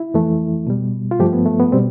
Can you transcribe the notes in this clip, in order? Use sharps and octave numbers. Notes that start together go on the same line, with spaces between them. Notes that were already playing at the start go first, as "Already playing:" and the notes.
Already playing: E4
F2 E3 A3
B2 G3
F4
G2 F3 A3 G4
B3
A3
B3
B2 G3 C4